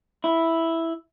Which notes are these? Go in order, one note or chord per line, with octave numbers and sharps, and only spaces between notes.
E4